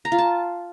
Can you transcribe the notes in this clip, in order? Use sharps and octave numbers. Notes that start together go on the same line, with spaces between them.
A#5
F4
A5